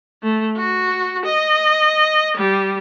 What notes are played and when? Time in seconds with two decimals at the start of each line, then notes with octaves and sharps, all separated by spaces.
0.23 A3
0.57 F#4
1.26 D#5
2.37 G3